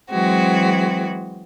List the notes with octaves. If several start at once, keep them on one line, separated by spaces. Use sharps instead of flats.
E3 F#3 G#3 C4 F#4